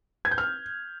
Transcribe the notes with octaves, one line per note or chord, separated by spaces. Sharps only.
G#6
G6
F6